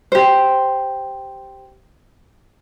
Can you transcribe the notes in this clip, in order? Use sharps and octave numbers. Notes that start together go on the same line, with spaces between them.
G4 C5